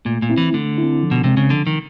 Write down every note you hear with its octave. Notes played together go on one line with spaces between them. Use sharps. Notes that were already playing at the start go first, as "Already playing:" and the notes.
A#2 A3
A#2
C4 E4
E3
D3 A3
E4
C4
F3
B2
C3 G#3 C4
C#3
D3 F3
D#3